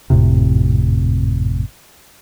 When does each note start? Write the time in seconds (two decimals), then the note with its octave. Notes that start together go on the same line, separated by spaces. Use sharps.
0.10 G#1 F2 A2 C3